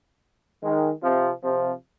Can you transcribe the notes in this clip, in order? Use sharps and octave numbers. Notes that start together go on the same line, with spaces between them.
D#3 G#3
C3 F3
C3 F3